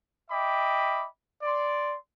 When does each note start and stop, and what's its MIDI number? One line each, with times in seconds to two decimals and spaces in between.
0.30 1.05 75
0.30 1.05 76
0.30 1.05 79
0.30 1.05 83
0.30 1.05 86
1.43 1.95 74
1.43 1.95 84